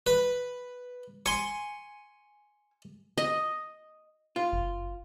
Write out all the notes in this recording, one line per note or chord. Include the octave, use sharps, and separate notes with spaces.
B4
G#5 C6 C#6
D#5
F4
F#1